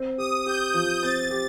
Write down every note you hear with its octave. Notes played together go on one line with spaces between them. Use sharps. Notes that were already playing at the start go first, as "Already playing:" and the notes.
Already playing: C4
G4 D#6
G4 G6
F3 G6
C4 A6
G4